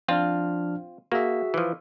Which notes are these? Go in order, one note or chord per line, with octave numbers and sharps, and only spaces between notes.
F3 C4 D4 F4 F6
A#3 F#4 G#4 E5
E3 F3